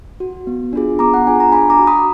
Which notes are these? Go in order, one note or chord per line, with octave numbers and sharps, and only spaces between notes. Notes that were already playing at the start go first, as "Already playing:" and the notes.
F#4
B3
D4 F4 G#4
B3 A#5 D6
F#5
D4 F4 G#4 G#5
A#5
D4 G#5 B5
A#5 D6
F#4
B5 D#6